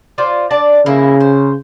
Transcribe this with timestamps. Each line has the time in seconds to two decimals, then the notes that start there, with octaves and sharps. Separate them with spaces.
0.18 F4 C5 D5
0.51 D4 D5 A5
0.86 C#3 F3 A#3 E4
1.20 C5